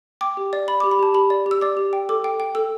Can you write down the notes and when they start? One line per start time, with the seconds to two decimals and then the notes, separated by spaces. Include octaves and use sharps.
0.21 G5 D6
0.37 G4
0.53 D5
0.68 D5 B5
0.80 G4 D6
0.91 B5
0.99 G4 A5
1.14 G4 B5
1.30 D5
1.46 G4
1.51 E6
1.61 D5 D6
1.77 G4
1.93 G5
2.09 A4 D6
2.24 G5
2.40 G5
2.55 A4 E6